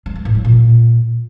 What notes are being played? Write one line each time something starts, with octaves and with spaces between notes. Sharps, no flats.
G#3
E3
A2
F#3
A#2